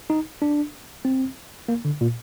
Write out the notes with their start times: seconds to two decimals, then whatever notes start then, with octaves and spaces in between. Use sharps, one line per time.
0.10 D#4
0.42 D4
1.05 C4
1.68 A#3
1.85 D3
2.01 A#2